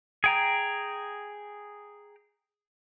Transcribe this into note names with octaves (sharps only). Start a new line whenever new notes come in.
G#4 G5 A#5